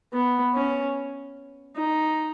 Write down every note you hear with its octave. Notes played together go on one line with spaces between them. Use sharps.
B3
C#4
D#4